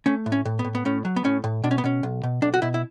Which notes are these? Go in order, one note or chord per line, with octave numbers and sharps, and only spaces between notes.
A3 C#4
A2
C#4
A2
B3
A2
B3
A2 C#4
F#3
B3
A2 C#4
A2
B2 D4
C#4
B3
B2 C#4
B1
B2
B1 D4
F#4
B2 E4
E4